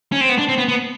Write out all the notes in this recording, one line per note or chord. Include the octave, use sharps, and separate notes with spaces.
C#4
C4
B3
D4
C4
B3
B3